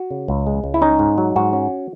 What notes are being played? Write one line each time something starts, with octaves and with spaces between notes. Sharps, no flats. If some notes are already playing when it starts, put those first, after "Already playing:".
Already playing: F#4
C#3
C#2
G#3
C#2
E4
C#4 D#4
G#2
F#3
G#2 F#4
C#4